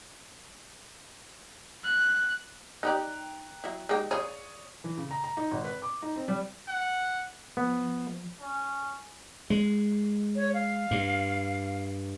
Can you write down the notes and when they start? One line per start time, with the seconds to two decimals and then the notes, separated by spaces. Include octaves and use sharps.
1.84 F#6
2.83 D#4 G4 D5 G5 A#5 F#6
3.64 F#3 E4
3.89 G#3 D#4 G4
4.11 F4 G#4 C#5 D5 D#6
4.84 E3
4.97 C#3
5.11 A#5
5.24 A#5
5.37 D#4
5.51 G#1
5.64 B4
5.82 D6
6.02 D#4
6.16 C4
6.28 G3
6.68 F#5
7.57 F3 B3
8.41 C#4
9.50 G#3
10.36 C#5
10.54 F5
10.91 G2